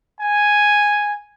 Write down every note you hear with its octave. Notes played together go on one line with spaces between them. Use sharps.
G#5